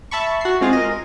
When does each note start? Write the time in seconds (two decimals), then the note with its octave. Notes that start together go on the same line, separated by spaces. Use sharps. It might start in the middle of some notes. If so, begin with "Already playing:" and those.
0.11 E5 A5 B5 C#6
0.41 F#4 C7
0.61 G#3 C4 F4 G#4 F5
0.73 A#4 D#5